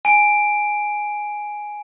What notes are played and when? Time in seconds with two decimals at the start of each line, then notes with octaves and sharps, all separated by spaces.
0.05 G#5 D7